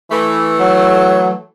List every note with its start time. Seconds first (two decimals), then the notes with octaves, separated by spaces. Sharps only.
0.11 E3 A3
0.60 F#3